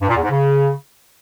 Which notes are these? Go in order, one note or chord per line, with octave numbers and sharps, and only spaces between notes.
G2
A#2
E2
G#2
C#3